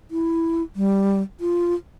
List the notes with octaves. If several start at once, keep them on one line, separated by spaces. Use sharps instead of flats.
E4
G3
F4